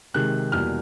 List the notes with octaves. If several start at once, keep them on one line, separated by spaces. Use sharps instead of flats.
C3 D#3 G#3 F#6
E2 B2 G3 A#3 F6